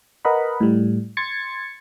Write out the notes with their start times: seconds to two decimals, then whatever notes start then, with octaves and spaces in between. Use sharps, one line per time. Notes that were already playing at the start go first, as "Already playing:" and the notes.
0.25 A#4 B4 D#5 F#5 B5
0.60 A2 G3
1.17 C6 G#6 A6 C#7